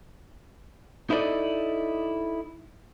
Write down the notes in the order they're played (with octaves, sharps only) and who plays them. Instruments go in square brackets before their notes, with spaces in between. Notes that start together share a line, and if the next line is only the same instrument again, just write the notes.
[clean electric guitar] D#4 E4 A4 B4 D5 D#5